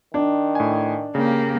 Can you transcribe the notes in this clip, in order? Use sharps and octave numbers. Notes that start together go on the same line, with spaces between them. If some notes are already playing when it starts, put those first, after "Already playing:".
D#3 D4
A2 G#5
C#3 A#3 G4